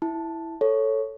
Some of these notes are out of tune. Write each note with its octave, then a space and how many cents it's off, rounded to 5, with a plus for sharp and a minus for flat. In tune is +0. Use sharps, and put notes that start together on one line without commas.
E4 +0 A5 +0
A4 +0 C#5 +0